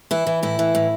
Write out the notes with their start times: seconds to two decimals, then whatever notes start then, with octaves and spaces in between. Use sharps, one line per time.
0.11 E3 E4
0.27 E3
0.43 A2 E4
0.59 E3
0.75 A2